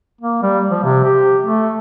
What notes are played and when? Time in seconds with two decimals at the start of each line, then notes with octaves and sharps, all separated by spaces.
0.21 A#3
0.43 G3
0.71 F3
0.84 C3
1.05 G4
1.43 A3